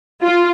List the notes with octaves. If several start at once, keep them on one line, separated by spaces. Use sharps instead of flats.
F4